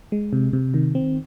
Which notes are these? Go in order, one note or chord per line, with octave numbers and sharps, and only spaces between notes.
G#3
C3
C3
D#3
C4